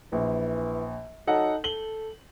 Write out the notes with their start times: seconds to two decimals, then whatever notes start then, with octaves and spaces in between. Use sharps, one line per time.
0.12 A#1 E3
1.27 F#3 D#4 A4 F#5
1.64 A4 F#7 G7